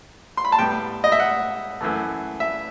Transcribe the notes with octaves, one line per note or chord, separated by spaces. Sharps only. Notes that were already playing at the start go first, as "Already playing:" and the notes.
C6
B5
A5
A2 G3 B3 G5
D#5
E5
F#5
F#2 E3 A3
E5